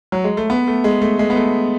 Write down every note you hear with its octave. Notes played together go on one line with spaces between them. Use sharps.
F#3
G#3
A3
B3
A3
G#3
A3
G#3
B3
A3